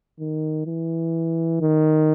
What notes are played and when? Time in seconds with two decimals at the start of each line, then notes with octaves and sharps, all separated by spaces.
0.20 D#3
0.67 E3
1.61 D#3